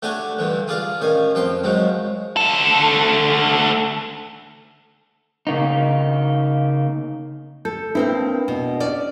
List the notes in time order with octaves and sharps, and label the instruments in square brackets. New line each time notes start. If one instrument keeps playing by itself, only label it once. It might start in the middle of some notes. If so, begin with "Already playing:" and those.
[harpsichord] A3 D4 F#4 G4 C#5 G#5
G2 D3 E3
F4 G#4 D5 F5
A1 D#3 F5 G#5
F2 F3 G5 C6
D#3 F3 F#3 G#3
[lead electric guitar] D2 A4
[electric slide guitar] C#3 A#3 D#4
[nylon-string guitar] A4 [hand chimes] G6
[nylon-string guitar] A#3 C4 E4 [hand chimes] D4 B4
[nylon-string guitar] B2
C#4 D5